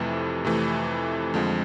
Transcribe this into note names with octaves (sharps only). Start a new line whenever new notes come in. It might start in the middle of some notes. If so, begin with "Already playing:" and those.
Already playing: F2 C3 E3 A3
F2 C3 E3 A3
F2 D3 F3 G#3